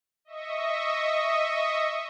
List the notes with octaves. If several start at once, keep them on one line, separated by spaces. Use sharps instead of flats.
D#5 E5 C#6 D#6